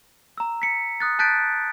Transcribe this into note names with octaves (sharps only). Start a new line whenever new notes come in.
A#5 E6
B6 C#7
D#6 F#6 A6
A5 F#6 G6 A6 B6 D7